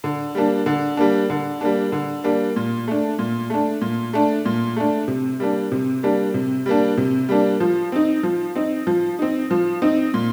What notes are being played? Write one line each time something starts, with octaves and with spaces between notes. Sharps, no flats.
D3
G3 A#3 D4
D3
G3 A#3 D4
D3
G3 A#3 D4
D3
G3 A#3 D4
A#2
A3 D4
A#2
A3 D4
A#2
A3 D4
A#2
A3 D4
C3
G3 A#3 D4
C3
G3 A#3 D4
C3
G3 A#3 D4
C3
G3 A#3 D4
F3
C4 D#4
F3
C4 D#4
F3
C4 D#4
F3
C4 D#4
A#2